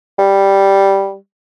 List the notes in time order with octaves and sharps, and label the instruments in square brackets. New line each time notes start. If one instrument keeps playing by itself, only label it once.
[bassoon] G3